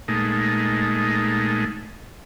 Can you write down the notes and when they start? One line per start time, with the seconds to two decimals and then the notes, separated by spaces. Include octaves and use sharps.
0.08 A#2 G#3 A3 D#4